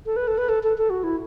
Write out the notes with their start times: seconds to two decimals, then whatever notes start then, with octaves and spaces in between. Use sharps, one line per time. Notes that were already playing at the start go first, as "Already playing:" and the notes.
0.06 A4
0.16 B4
0.28 A4
0.38 B4
0.49 A4
0.63 A4
0.78 A4
0.90 F#4
1.04 E4